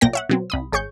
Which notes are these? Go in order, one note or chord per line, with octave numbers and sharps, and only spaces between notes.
B1 A#2 A#3 G5 A#6
C#5 E5 F#5
B2 F#3 C4
C2 B5 D#6
G#1 G#4 C#5 C#6 G6